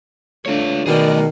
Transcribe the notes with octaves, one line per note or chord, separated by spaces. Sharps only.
A3 D4 F4 C#5
B2 D#3 A3 G#4 A#4 D5